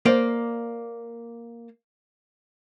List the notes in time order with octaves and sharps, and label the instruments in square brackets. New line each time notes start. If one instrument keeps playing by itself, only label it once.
[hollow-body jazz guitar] A#3 C5 D5